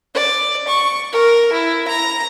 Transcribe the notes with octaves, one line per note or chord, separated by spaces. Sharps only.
D5
C#6
A#4
E4
A#5